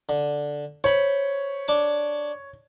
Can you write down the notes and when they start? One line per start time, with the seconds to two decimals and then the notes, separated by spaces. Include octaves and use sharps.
0.09 D3
0.84 C5 C#5 B5 C6
1.68 D4 D6